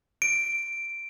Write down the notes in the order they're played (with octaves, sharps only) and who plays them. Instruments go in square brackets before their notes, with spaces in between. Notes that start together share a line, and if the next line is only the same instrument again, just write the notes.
[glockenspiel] D7